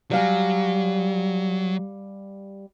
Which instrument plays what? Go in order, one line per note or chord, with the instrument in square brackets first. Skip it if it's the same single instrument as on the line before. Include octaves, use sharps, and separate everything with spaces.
[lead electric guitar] F#3 [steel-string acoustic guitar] G3 F5 G#5